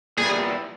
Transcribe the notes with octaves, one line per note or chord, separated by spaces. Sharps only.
A#2 G3 B3 E4 G#4